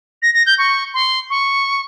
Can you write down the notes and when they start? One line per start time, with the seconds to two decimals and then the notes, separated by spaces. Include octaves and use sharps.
0.22 A#6
0.34 A#6
0.46 G6
0.58 C#6
0.94 C6
1.30 C#6